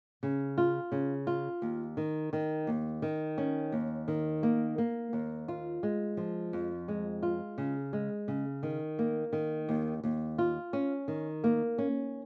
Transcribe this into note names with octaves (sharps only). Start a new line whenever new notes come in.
C#3
F4
C#3
F4
D#2
D#3
D#3
D#2
D#3
C#4
D#2
D#3
A#3
A#3
D#2
F4
G#3
F3
F2
G#3
F4
C#3
G#3
C#3
D#3
A#3
D#3
D#2
D#2
F4
C#4
D#3
A#3
C#4